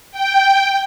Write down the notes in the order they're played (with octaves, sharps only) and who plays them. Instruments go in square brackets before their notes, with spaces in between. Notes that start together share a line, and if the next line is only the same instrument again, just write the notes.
[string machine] G5